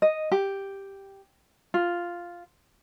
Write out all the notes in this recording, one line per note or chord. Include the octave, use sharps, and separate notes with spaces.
D#5
G4
F4